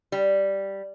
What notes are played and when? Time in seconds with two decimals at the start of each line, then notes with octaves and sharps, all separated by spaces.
0.12 G3